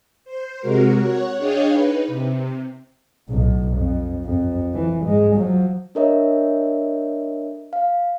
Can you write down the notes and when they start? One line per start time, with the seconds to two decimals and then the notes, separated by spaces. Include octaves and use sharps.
0.25 C5
0.60 C3 G#3 F#4 A#4
0.98 C#5 F#5
1.38 D4 G#4 C#5 D#5 F5 G5
1.70 D#4 B4
2.07 C3
3.29 B1 A2
3.75 F2
4.25 F2
4.74 E3
5.04 G#2 G#3
5.36 F3 F#3
5.95 D4 A4 A#4 C#5 D#5 E5
7.73 F5